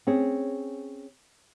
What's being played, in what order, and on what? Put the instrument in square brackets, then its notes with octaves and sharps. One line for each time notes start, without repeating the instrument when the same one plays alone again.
[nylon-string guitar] C4 C#4 G#4